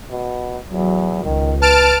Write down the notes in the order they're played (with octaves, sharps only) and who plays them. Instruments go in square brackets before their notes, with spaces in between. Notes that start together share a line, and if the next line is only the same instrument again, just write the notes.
[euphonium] B2
[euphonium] E2 [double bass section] F#3
[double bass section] C#2 [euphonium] D#3
[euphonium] B4 [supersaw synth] A5 F6 D7